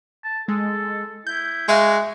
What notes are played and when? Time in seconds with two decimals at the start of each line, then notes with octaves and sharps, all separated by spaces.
0.24 A5
0.48 G#3 A4
1.27 E4 G6
1.69 G#3 F#4 E5 F5